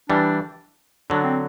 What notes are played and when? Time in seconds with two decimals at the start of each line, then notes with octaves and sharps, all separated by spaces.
0.10 E3 G3 D4
1.10 D3 F#3 D4
1.24 C4